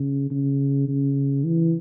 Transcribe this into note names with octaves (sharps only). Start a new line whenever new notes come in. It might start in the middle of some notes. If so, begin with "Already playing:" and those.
Already playing: C#3
C#3
C#3
E3